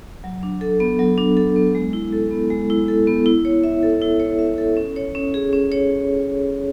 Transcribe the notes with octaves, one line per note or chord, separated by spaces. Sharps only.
F#3
D4
A4
B3
F#3
D4
A4
B3
G#3
E4
A4
B3
G#3
E4
A4
B3
E4
C#5
E5
A4
E4
C#5
E5
A4
C#4
C#5
C#4
G#4
C#4
C#5